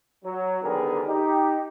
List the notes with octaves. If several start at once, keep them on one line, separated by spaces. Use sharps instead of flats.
F#3
D3 D#3 G3 B3 G#4 A#4
D#4 G4